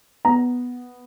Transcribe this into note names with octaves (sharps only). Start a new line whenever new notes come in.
B3 A#5